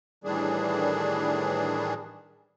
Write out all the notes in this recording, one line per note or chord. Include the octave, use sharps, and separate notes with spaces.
A2 D#3 E3 G3 D4 G#4